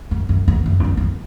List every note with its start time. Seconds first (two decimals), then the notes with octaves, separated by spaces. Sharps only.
0.11 F#2
0.29 F#2
0.48 E2
0.66 F#2
0.80 E2
0.84 F#2
0.97 F#2